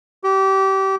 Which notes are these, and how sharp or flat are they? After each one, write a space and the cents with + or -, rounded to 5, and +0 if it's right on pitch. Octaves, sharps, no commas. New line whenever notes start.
G4 -25